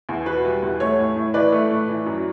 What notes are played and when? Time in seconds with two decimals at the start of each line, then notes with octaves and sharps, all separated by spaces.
0.09 E2
0.26 B2 B4
0.45 G3
0.62 E2
0.80 A3 C#5
0.99 A2
1.16 A2
1.34 E3 B4 D5
1.52 A3
1.71 A2
1.88 E3
2.06 F#2